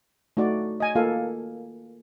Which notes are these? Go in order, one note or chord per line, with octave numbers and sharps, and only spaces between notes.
A3 D#4 F#4 D5
D#5 G#5
A#3 F4 A4 F5